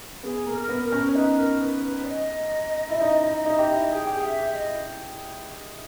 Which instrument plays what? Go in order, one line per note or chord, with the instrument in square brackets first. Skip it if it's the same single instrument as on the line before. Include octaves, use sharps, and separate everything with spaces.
[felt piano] B3 [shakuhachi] G#4
[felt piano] A#3
[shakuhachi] A#4
[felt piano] B3
[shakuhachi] A#4
[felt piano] C#4
[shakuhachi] C#5
[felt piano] D#4 [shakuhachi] B4
[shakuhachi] A#4
B4
B4
D#5
[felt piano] E4
D#4
D#4
D#4
G4
E4
[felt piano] G#4 [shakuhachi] G5
[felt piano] G4
G#4
[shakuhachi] E5
[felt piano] G4
[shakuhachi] D#5
[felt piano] E4